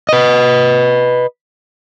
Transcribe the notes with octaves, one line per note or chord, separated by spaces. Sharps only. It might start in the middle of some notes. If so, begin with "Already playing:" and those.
B4 D#5